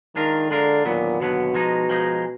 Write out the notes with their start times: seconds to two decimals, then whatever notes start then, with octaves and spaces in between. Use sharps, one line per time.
0.16 D#3 G#3 D4 F4 A#4
0.50 D3 G#3 D4 F4 A#4
0.85 D#2 A#2 D3 F#3 B3
1.20 D#2 B2 D3 F#3 B3
1.54 F3 G#3 D#4
1.90 F3 G#3 D#4